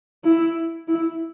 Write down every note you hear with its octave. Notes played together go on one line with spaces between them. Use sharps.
E4
E4